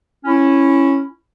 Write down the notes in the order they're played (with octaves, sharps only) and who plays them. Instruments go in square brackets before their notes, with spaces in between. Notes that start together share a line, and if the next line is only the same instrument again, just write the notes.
[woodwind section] C#4 E4